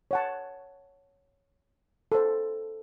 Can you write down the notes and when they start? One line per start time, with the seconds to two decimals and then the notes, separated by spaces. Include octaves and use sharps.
0.11 C#5 F#5 A5
2.12 A4 C5